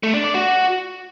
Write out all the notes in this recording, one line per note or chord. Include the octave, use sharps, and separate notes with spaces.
A3
D4
D5
F#4